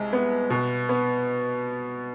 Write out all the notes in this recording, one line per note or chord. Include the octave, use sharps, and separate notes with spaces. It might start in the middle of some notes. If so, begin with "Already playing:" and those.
Already playing: C2 G#3
B3
B2
B3